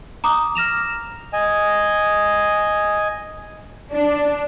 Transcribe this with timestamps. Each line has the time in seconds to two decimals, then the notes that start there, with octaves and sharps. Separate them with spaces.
0.24 A#5 D6 D#6
0.55 F6 A#6 E7 F7
1.33 D#5 G#5
3.92 D4